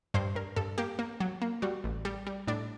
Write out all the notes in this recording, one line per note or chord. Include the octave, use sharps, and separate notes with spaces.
G2 C5
G2 A#4
G2 A4
A#3 G4
A#3
F#3
A#3
G3 F#4
A1
G3
G3
A2 D4